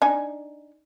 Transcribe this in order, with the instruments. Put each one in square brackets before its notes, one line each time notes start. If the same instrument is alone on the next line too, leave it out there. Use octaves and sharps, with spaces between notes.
[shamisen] D4 D#4 G#5